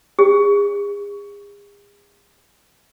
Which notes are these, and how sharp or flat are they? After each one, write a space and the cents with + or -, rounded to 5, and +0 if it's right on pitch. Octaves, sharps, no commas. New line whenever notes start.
G#4 -40